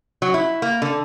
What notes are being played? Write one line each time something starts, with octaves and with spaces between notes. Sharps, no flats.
F#3
E4
A#3
D3